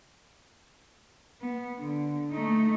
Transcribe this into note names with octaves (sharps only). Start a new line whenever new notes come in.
B3
D3
A3 D#4